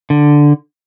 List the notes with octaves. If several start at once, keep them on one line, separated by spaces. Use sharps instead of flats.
D3